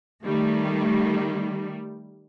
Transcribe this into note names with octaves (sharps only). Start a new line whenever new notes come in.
D#3 G3 A3